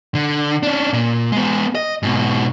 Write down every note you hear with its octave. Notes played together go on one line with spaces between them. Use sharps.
D3
C#4 D4
A#2
G#3 B3
D#5
G#2 B2